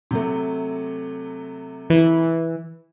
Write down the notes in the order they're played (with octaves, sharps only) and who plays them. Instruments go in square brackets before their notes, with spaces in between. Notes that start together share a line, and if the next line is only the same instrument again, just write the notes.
[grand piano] C3 F#3 A3
[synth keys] E3